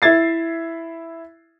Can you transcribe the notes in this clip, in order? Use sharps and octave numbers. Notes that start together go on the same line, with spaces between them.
E4 E5 G#6 A6 C7